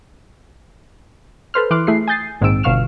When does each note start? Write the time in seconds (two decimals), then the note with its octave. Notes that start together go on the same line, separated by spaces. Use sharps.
1.54 A4 B4 C5 F6
1.71 E3 C6 D6 F6 F#6
1.87 A3 E4 G#4 C7
2.08 G#5 D#6 G6 A6 C7
2.41 A#1 G#2 D#3 C4 E6 D7
2.63 G1 B2 F5 C#6 F6 E7